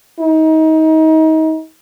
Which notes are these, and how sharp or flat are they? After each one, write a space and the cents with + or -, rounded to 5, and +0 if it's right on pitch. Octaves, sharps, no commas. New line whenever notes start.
D#4 +30